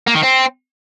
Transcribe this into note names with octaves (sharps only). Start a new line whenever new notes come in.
A#3
D#3
C4